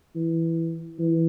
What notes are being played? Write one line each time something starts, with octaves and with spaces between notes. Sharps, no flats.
E3
E3